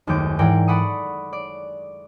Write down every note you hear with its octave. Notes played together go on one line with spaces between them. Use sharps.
F#1 D#2 G#3 A3 D6 G6
G#2 E3 A#4 D5 G5
A4 D5 F#5 B5 C#6 D#6
D5